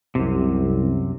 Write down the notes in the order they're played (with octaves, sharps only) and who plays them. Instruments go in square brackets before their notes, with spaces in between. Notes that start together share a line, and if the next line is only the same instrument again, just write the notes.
[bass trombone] C2 [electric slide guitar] F#2 C3